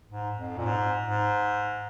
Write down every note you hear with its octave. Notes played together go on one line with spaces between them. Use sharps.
G#2
F2
A#2
G#2
G#2